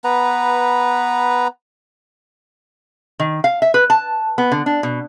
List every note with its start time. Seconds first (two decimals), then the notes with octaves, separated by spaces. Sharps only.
0.04 B3 B4 A#5
3.19 D#3
3.44 F5
3.62 E5
3.74 B4
3.90 A5
4.38 B3
4.52 D3
4.66 D4
4.83 B2